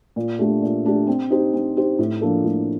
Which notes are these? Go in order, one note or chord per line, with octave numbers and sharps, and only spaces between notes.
A#2
A3 D4 G4
A#2
A3 D4 G4
C4
D#4 G4 C5
C4
D#4 G4 C5
A2
F3 A#3 D4 A4
A2